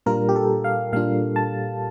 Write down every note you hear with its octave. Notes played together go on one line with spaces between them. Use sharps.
A#2 G3 D4 F4 A#4
G4
A4
F5
A#2 G3 D4 F4 F5
A5